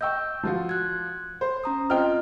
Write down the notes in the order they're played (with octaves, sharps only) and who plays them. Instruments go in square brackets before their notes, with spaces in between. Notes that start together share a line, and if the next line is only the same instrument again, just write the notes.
[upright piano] D#5 G5 [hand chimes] C#6 E6 G6
[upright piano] F3 F4 F#4
[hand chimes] F#6 G#6
[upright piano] C5
[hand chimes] C#4 A#5 D#6
[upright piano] C4 G5 F6 [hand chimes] F4 C5 D#5